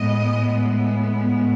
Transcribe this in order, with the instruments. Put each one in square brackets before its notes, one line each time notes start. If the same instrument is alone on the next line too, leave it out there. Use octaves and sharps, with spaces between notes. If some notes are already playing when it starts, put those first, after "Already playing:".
Already playing: [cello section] A2 G#3 B3 D#5